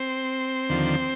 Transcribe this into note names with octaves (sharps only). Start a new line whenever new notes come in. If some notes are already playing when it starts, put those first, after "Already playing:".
Already playing: C4 C5
D#2 D3 F3